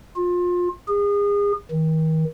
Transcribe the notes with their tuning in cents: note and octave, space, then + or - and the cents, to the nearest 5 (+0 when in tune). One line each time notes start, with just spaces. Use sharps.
F4 +25
G#4 -35
D#3 +40